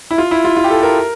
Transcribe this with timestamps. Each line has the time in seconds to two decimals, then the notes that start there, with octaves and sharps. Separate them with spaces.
0.11 E4
0.18 F4
0.31 E4
0.45 F4
0.56 F4
0.64 G4
0.70 A4
0.83 A#4